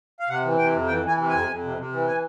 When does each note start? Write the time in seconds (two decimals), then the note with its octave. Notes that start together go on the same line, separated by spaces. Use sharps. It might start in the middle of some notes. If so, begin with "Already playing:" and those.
0.20 F5
0.29 C3 F#5
0.44 E3
0.58 C3 G5
0.73 F2
0.88 E3 G5
1.03 E3 G#5
1.17 C3
1.29 F2 G#5
1.47 F2
1.63 C3
1.78 C3
1.92 E3
2.07 G#5